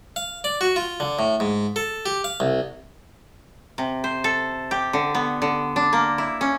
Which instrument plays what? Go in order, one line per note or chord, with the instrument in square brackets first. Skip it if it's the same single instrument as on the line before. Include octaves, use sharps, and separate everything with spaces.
[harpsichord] F5
D5
F#4
F4
D3
A2
G#2
A4
G4
F5
C2
[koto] C3
C5
A4
G4
D3
B3
D3
D4
A#3
E4
C#4